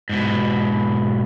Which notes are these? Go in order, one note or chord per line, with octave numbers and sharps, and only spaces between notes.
G#2 B2